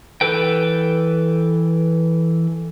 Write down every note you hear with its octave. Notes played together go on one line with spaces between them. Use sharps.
E3 A4 B4 G5